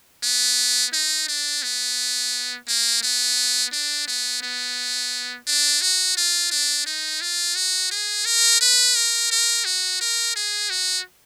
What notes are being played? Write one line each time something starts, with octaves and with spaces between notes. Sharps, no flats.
B3
D#4
D4
B3
A#3
B3
D4
B3
B3
D4
F#4
F4
D4
D#4
F4
F#4
G#4
A#4
B4
A#4
A#4
F#4
A#4
G#4
F#4